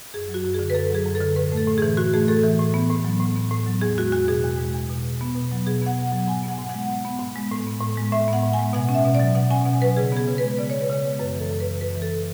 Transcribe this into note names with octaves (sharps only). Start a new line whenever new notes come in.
F#2 G#4
F#3
F#4
F#2
D3 G#4
B4
F#2 A4
F#3 G#4
F#2
A4
D3
A2 B4
A3
A4
A2
E3 G#4
A2 F#4
A3 G#4
A2 A4
E3
A2
B3
A2
F#3
A2
B3
A2
F#3
E2 G#4
G#3 F#4
E2 F#4
B2 G#4
E2
G#3
E2
B2
B2
B3
B2
F#3
B2 G#4
B3 F#5
B2
F#3 F#5
G#2 G#5
B3
F#5
G#2
G#3 F#5
G#2
B3
G#2
G#3
A2
B3
A2
G#3
A2 E5
B3
F#5
A2
G#5
G#3
B2 F#5
C#4
E5
B2
F#3 D5
B2 F#5
C#4 G#5
B2 F#5
F#3 B4
C#3 G#4
B3 G#4
C#3
G#3 B4
C#3 D5
B3 C#5
B4
C#3 C#5
G#3
F#2 B4
E3 A4
F#2
C#3 B4
F#2 B4
E3
A4